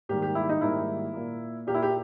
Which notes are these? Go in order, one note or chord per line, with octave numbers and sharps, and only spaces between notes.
G#2 D#3 G3 A#3 G4
G4
E4
D#4
G#2 D#3 G3 A#3 E4
A#2 A#3
A#2 A#3 G4
E4
G4